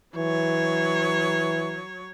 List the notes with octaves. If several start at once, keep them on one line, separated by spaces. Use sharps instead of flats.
E3 F#3 C#5